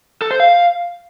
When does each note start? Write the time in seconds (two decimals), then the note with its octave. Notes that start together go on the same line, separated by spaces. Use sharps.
0.22 A4
0.31 C5
0.40 F5